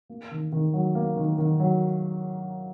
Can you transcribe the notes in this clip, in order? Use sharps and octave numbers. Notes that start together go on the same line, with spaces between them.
A#3
D#3
D#3
F#3
A#3
D#3
D#3
F#3